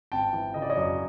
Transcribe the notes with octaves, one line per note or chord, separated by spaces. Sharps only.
G#1 G5 A5
E3
C#3 D#5
D5
C#5 D#5
F#2